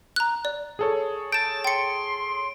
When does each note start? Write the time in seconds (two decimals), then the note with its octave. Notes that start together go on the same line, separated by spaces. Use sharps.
0.16 A#5 F#6
0.45 D5
0.79 G#4 A4 C#5
1.32 A5 G6 D7 E7
1.64 G5 C6 C#7